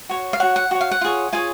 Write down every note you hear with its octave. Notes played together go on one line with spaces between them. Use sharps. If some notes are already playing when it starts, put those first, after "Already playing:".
F#4 C#5
F5
F#4 C#5 F#5
F#5
F#4 C#5
F5
F#5
F4 G#4 C#5
F4 G#4 C#5 G#5